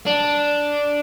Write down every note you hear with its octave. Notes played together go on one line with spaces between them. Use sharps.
D4